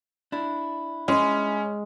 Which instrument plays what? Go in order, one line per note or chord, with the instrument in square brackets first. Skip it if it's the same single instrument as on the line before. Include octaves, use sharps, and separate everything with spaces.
[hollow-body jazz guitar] D4 E4
[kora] G#3 [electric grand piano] C#4